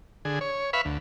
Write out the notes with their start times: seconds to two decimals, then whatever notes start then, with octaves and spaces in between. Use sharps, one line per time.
0.25 D3 G#4
0.41 C#5
0.73 B4 E5 F5 B5 C#6
0.85 D2